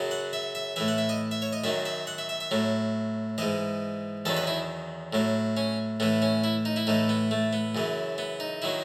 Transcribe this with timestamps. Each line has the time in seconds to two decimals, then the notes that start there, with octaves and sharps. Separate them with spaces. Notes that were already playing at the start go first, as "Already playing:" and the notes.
Already playing: F#2 C#3 F#3
0.11 F#5
0.33 E5
0.55 E5
0.76 A2 E3 E5
0.88 F#5
0.98 E5
1.09 D#5
1.31 E5
1.42 C#5
1.53 D#5
1.64 F#2 D#3 F#3 E5
1.85 E5
2.07 F#5
2.18 E5
2.29 E5
2.40 E5
2.51 A2 F#3
3.38 G#2 E3 D#5
4.25 E2 D#3 F#3 A4
4.37 B4
4.47 E4
5.13 A2 F#3
5.57 C#4
6.00 A2 E3 B3
6.22 C#4
6.44 E4
6.65 D#4
6.76 E4
6.87 A2 E3 D#4
7.09 B3
7.31 A3
7.53 B3
7.75 F#2 C#3 E3
8.18 B3
8.40 D#4
8.62 D#3 F#3 E4